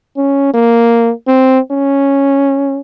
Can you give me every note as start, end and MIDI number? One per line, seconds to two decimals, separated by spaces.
0.17 0.51 61
0.54 1.12 58
1.28 1.59 60
1.71 2.80 61